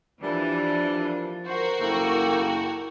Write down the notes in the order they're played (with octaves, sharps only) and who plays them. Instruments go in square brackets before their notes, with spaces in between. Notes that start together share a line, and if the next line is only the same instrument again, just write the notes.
[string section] E3 [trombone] F3 [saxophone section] G3 A#3 D4
[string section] F#4 A#4 [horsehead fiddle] C5
[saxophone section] F#2 C#3 A4 [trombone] A#3 [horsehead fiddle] E4 G5